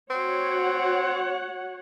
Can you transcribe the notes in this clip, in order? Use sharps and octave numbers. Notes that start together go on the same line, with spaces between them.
C4 F#4 C#5 F#5